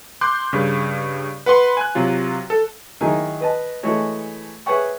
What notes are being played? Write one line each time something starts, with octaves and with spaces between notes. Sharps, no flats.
C6 D6 F#6 G6
G2 C#3
B4 F#5 B5 C6
G#5 F#6
C3 F#3 F4
A4
D#3 F#3 D#4 E4 G#4 A#4
B4 D#5 A5
E3 G#3 A3 F#4 C#5
G#4 B4 C#5 E5 F#5 C#6